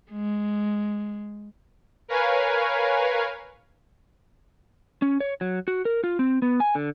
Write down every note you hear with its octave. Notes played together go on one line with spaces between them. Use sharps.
G#3
A#4 B4 C#5 F5 G#5
C#4
C#5
F#3
F#4
A#4
F4
C4
B3
G#5
D3